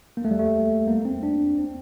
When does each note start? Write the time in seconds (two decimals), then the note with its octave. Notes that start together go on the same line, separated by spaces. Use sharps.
0.17 A#3
0.25 A3
0.31 G3
0.39 A3
0.87 A#3
1.05 C4
1.23 D4
1.58 C4